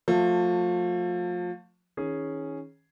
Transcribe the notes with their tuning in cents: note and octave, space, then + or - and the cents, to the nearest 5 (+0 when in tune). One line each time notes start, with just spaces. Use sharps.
F3 +30 A3 +25
D#3 +30 C#4 -5 G#4 +0